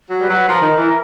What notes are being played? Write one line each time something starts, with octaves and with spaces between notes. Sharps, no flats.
F#3
G3 B4
F#3
F3 A#4
D#3
E3